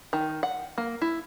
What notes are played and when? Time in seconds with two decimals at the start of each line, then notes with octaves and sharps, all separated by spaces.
0.13 D#3
0.43 F#5
0.78 A#3
1.02 E4